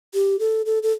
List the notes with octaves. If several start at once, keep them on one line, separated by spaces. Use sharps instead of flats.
G4
A4
A4
A4